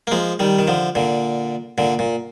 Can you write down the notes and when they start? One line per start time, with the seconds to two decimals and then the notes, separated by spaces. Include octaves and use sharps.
0.07 A#3
0.12 F3 G#3
0.40 D#3 G3
0.59 D#3
0.67 D3 F3
0.95 A#2 D3
1.78 A#2 D3
1.99 A#2